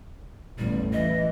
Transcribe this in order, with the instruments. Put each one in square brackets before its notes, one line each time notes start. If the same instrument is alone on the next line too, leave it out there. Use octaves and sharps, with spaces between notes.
[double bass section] A1 E2 [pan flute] G3
[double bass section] E3 [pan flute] D#5